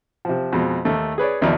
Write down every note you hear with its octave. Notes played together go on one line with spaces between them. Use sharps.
C3 F3
F2 B2 G#3
D#2 A3
G#4 B4 C#5 D5
A#1 D#2 B2 E4 D5 A#5